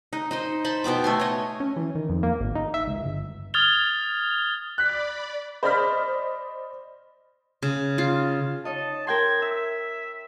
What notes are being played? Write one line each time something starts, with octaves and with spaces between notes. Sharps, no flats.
D#4
D#4 C5 D#5
C5 A5 B5
B2 B3 G5 D6
A3 G#5 C6
C#5 D#5
C#4
E3
D#3
F2
A#3
G#1
D#4
E5
C#2
G1
D#6 F6 G#6 A6 F7 G7
D5 B5 F#6 B6
C5 D5 D#5 B5 F6 B6
C#3
F4
D#4 C#5 D#5 A5
A#4 G5 C6 G#6
E5 E6